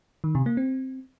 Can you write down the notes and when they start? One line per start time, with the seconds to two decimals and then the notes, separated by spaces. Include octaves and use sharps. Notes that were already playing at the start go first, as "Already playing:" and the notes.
0.24 D#3
0.35 C3
0.46 A#3
0.57 C4